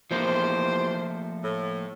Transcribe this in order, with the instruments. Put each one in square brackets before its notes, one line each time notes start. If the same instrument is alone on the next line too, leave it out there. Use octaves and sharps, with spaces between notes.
[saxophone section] E2 G4 C5 [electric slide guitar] F3 A3 A#3
[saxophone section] A2